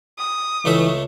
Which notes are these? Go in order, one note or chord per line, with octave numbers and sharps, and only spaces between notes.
D#6
C#2 E3 A3 E5